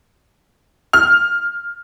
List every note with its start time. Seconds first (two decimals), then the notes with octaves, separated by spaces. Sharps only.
0.93 F6